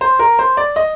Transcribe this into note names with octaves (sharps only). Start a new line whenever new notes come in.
C5
A#4
C5
D5
D#5